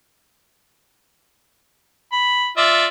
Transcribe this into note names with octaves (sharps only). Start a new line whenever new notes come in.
B5
F4 D5 E5